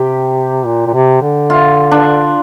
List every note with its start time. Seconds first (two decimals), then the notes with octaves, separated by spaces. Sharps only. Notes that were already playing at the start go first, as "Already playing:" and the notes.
Already playing: C3 G4
0.66 A#2
0.87 A#2
0.94 C3
1.22 D3
1.50 F4
1.91 D4